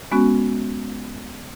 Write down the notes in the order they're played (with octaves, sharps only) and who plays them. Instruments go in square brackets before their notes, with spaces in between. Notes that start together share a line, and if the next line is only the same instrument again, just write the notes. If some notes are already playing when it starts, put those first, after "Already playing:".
[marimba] G#3 B3 C#4 F#4